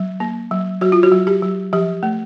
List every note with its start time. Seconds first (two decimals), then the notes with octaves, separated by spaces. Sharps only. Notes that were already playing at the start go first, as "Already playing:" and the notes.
Already playing: F#3
0.20 A#3
0.51 F#3
0.81 F#3 F#4
0.92 F4
1.03 F#4
1.12 F#3
1.27 G4
1.42 F#3
1.73 F3 G4
2.03 A3